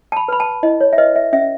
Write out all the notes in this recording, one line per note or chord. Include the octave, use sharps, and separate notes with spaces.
A5
B5
B4 B5
A5
E4 D#5
C#5
E5
B4 D#5
E5
C#4 E5